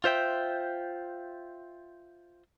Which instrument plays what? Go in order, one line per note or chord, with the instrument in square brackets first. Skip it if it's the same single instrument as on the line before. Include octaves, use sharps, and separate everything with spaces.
[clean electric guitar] F4 C5 E5 G5